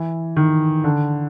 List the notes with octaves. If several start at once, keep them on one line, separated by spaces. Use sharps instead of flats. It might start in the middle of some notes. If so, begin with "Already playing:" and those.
Already playing: E3
D#3
D3